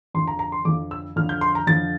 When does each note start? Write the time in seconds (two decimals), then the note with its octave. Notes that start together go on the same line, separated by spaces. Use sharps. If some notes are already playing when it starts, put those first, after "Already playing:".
0.14 F2 D3 F3 C6
0.28 A#5
0.39 A#5
0.52 C6
0.65 F2 D3 F3 D6
0.91 E6
1.16 F2 D3 F3 F6
1.29 G6
1.41 C6
1.55 A#5
1.67 F2 D3 F3 A6